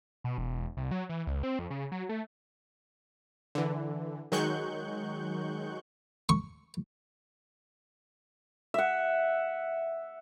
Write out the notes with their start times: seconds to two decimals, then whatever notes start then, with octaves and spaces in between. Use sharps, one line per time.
0.24 B2
0.38 E1
0.77 C2
0.91 F#3
1.09 E3
1.27 C#2
1.43 C4
1.59 F2
1.70 C#3
1.92 F#3
2.09 A3
3.55 D3 E3
4.32 D#3 F#3 G#3 C#6 F#6 G6
6.29 C#6
8.74 E5 F#5